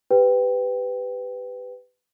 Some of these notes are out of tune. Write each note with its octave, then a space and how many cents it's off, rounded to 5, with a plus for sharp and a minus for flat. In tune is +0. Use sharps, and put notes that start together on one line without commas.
G4 +5 B4 +15 G5 +5